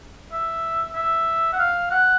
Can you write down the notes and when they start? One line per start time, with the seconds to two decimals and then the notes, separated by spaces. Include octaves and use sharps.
0.32 E5
0.95 E5
1.53 F#5
1.59 F5
1.91 F#5